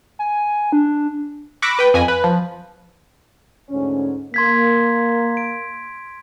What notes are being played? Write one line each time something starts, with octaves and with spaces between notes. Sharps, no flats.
G#5
D4
B5 C#6 D6 E6 F#6 A#6
B4 G5
F2 G#5 B5 A#6
B4
F3
D2 G#2 C#4
A#3 C6 G#6 B6
D7